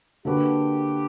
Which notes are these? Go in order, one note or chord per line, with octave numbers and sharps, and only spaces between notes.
D3 A#3 D4 F#4 G4 B4